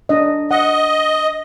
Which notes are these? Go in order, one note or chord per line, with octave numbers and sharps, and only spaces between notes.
D4 D#5
D#5 F#5